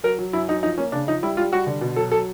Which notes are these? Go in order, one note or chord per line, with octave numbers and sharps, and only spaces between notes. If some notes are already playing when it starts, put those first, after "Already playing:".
F#3 A#4
F#3
F#2 E4
F#2 D#4
F3 D#4
A#3 C#4
C#3 D4
F3 D#4
G3 E4
G3 F4
G3 F#4
D3
B2
F#3 A4
F#3 A4